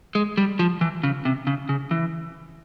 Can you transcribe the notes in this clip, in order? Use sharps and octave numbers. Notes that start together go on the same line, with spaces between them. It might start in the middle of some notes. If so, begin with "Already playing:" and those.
G#3
G3
F3
E3
C#3
C3
C#3
C#3
E3